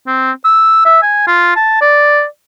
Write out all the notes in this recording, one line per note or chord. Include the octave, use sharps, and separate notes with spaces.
C4
E6
E5
G#5
F4
A5
D5